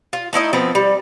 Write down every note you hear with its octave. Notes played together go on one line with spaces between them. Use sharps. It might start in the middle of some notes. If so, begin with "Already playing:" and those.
F4
A3 D#4 E4 D#5
F3 B3 C4
G3